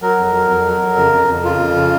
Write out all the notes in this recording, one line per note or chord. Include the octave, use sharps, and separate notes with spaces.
F#3 A#4
F2
F#3
F2
F#3
F2
C#3
F2
F2
C#3 F4
F2
C#3